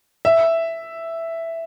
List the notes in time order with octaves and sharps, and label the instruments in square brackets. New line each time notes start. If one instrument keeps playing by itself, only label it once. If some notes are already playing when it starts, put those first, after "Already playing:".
[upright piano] E5